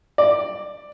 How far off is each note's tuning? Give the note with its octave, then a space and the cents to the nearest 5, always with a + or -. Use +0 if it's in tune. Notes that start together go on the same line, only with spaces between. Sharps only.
D5 +10